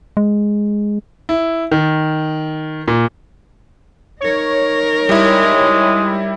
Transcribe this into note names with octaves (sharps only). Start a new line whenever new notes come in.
G#3
E4
D#3
A#2
D#4 A#4 C#5
G3 G#3 E4